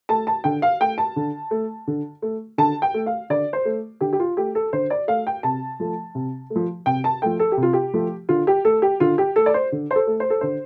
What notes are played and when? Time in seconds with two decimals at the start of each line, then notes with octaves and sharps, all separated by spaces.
0.09 A3 A5
0.27 A5
0.44 D3 G5
0.62 F5
0.80 A3 G5
0.98 A5
1.16 D3
1.51 A3
1.88 D3
2.22 A3
2.58 D3 A5
2.82 G5
2.94 A3
3.06 F5
3.30 D3 D5
3.53 C5
3.65 A3
4.01 D3 G4
4.13 G4
4.20 F4
4.37 A3 G4
4.55 A4
4.73 D3 C5
4.90 D5
5.08 A3 F5
5.27 G5
5.43 C3 A5
5.80 F3 A3
6.15 C3
6.50 A3
6.56 F3
6.86 C3 G5
7.04 A5
7.22 F3 A3 G5
7.40 A4
7.52 G4
7.57 C3
7.63 F4
7.73 G4
7.94 F3 A3
8.29 D3 F4
8.47 G4
8.65 A3 A4
8.82 G4
9.00 D3 F4
9.18 G4
9.36 A3 A4
9.46 D5
9.54 C5
9.72 D3
9.91 C5
9.95 A4
10.07 A3
10.20 C5
10.30 A4
10.41 D3 C5